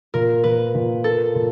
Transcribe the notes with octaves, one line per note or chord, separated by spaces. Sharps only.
A#2 A#4
A#2 B4
A#2
A#3 A4
A#2